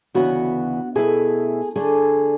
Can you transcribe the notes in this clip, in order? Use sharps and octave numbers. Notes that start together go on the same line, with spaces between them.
D2 C#3 E3 B3 F#4 F#5
B2 A3 E4 G#4 G#5
D3 A3 D4 G#4 G#5